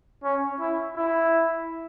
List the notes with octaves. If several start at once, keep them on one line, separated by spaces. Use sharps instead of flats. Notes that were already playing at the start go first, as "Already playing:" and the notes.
C#4
E4
E4